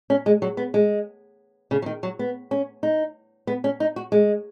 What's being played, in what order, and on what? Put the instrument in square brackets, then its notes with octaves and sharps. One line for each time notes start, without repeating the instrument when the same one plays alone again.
[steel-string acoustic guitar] C#4
G#3
F#3
B3
G#3
C#3
F#3
D#3
F#3
B3
C#4
D#4
B3
C#4
D#4
F#4
G#3